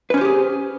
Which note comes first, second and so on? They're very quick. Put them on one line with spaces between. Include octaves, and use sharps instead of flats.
B4 C#4 C5 G4 G#4